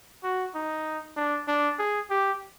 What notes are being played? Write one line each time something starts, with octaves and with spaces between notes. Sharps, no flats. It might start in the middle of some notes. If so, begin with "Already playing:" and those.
F#4
D#4
D4
D4
G#4
G4